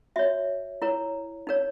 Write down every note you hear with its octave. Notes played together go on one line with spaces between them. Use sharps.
F#4 C#5 E5
E4 A#4 C#5
D#4 A#4 C#5